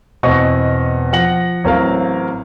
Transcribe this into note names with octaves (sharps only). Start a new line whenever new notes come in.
E2 B2 B3 C4 D#5 C#6
F3 F#5 A#6 F#7
A1 F#3 C4 A#4 F5